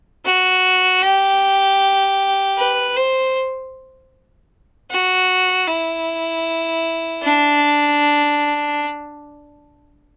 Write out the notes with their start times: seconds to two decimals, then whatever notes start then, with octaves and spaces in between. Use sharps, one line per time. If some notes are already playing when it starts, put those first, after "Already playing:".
0.25 F#4
1.02 G4
2.57 B4
2.96 C5
4.90 F#4
5.67 E4
7.23 D4